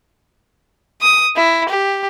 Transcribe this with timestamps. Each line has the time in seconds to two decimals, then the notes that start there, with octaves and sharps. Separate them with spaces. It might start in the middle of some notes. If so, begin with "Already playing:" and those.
1.02 D#6
1.36 E4
1.69 G4